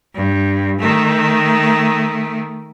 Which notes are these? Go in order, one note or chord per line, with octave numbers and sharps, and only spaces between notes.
G2
D#3 A3